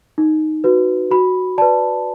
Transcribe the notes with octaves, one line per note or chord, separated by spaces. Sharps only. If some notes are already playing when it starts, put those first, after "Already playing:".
D#4
F#4 B4
F#4 B5
B4 D5 A5